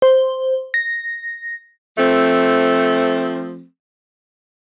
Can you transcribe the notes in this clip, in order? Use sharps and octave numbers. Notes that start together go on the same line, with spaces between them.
C5
A#6
F3 A3 C4